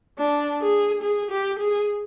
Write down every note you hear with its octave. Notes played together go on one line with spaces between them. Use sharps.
D4
G#4
G#4
G4
G#4